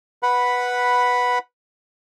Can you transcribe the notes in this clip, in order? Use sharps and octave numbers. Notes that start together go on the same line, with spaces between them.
B4 F#5 B5